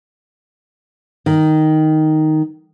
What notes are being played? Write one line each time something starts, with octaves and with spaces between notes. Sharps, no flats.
D#3